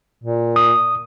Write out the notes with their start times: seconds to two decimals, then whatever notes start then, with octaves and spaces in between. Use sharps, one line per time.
0.24 A#2
0.56 D#6